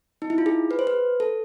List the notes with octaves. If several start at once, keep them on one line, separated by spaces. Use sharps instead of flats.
D#4
E4
F4
G#4
B4
C5
B4
A4